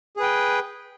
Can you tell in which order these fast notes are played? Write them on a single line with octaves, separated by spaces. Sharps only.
G#4 B4 G5